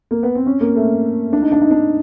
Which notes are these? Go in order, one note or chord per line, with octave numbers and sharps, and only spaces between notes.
A#3
B3
C4
C#4
A#3
A3
D4
D#4
D4
D#4
D4